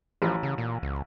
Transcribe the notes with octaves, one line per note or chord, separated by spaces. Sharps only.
A1 F3
C#3
A#2
C#2